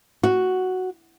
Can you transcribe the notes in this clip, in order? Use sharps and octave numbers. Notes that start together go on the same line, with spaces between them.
F#4